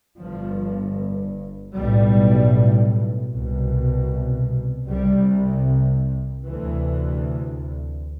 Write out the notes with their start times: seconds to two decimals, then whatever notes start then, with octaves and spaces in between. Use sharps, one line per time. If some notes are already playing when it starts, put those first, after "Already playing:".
0.19 G1 G2 F3
1.76 B1 A2 G3
3.32 C2 B2
4.89 C2 C3 G3
6.45 D2 C3 E3